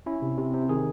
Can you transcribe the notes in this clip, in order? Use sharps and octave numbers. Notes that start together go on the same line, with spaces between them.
C#4 E4
C3
C3
C3
D#3 G#4